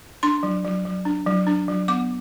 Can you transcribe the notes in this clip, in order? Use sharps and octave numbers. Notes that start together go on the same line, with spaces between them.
D4 C6
F#3
F#3
F#3
D4
F#3
D4
F#3
B3 D6